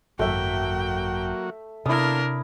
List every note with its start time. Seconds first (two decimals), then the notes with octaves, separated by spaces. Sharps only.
0.19 G#1 F#2 F#3 A3 A#3 F#4 E5 G5
1.86 C3 B3 D4 E4 A4 A#4 F5 D#6